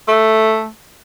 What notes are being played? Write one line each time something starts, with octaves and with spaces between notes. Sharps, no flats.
A3